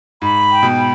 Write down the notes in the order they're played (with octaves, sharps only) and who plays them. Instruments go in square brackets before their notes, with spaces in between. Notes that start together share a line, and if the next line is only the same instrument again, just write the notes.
[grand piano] G#2 [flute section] B5
[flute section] G5
[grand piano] B2
[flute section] B5